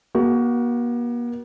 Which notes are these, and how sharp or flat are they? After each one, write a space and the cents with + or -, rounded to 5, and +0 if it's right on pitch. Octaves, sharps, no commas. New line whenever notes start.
A#3 +45 F#4 +25